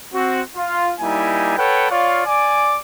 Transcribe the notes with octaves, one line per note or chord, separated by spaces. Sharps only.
C4 F#4
F4
G3 A#3 D#4 E4 G#5
A4 B4 C#5 F#5 G5
F4 C#5 D5 F5
D5 G#5 D6